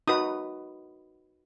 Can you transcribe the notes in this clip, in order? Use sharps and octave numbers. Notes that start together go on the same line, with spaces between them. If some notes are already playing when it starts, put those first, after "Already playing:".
D#4 F#4 B4 D#6